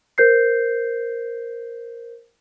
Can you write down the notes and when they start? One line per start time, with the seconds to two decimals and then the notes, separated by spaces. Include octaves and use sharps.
0.18 A#4 C5 G6 C7